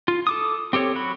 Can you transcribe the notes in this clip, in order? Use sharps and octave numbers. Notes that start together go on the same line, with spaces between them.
F4
A4 D6 D#6
C4 G4 A4 C#5
F#3 F#4 B5